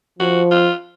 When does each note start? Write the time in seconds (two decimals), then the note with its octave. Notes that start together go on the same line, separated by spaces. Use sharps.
0.19 F3 F#4
0.51 F4